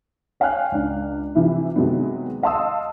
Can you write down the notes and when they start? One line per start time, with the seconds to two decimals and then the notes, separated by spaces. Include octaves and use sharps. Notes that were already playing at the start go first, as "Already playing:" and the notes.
0.40 C#5 F5 G5 G#5 F6 F#6
0.72 C#2 D4
1.35 C3 E3 F3 E4
1.76 C3 D#3 F#3 G#3 B3
2.43 D#5 F5 A5 C6 D#6 E6